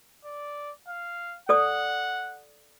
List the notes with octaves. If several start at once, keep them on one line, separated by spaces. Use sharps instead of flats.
D5
F5
A4 D5 F#5 D#6